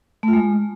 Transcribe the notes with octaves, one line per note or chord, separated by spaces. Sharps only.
A3
F4
G#3